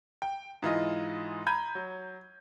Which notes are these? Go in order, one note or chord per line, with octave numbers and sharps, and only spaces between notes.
G5
G#2 E3 F4 D#5
A#5 B5 G6 G#6 D#7
F#3